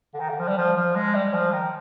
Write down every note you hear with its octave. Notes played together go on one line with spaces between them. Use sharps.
D3
D#3
D3
F3
G3
F3
F3
G#3
G3
F3
D#3